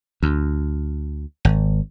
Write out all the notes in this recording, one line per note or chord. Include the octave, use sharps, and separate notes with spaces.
D2
G#1